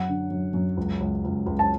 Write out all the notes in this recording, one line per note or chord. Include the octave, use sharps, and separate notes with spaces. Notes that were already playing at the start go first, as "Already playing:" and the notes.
Already playing: F#2 F#5
D3
F#2
F#2
C#2
C#2
C#2
C#2
A5